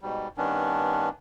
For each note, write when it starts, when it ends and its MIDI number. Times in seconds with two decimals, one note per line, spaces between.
0.01 0.28 44
0.01 0.28 47
0.01 0.28 55
0.37 1.09 43
0.37 1.09 51
0.37 1.09 59
0.37 1.09 61
0.37 1.09 62